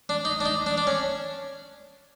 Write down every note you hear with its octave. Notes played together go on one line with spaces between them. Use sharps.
D4
D#4
D4
D#4
D4
D4
C#4